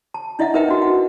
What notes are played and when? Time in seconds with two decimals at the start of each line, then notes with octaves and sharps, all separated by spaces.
0.14 A5
0.39 D4 E4 D#5 E5 F#5
0.54 D#4 A#4 B4 E5 F#5 G5
0.69 D4 F#4
0.82 F#5